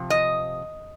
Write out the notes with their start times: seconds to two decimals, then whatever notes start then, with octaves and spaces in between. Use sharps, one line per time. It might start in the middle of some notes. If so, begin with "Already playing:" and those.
Already playing: C3 F3
0.10 D#5